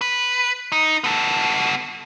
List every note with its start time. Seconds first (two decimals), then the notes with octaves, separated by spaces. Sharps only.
0.01 B4
0.72 D#4
1.04 B3 A4